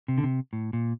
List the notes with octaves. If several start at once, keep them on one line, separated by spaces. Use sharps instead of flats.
C3
D3
C3
A2
A#2